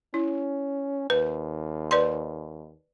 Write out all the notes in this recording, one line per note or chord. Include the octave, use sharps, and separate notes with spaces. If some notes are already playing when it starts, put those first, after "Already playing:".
C#4 E4
D#2 B4
B4 D5 C6